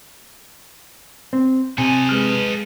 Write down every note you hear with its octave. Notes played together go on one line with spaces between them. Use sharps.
C4
C3 A4 D#5 G#5
G#3 B4 F6